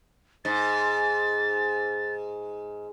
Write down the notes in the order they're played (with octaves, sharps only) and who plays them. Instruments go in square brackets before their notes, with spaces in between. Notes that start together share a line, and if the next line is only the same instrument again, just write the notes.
[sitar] G#2 [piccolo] A6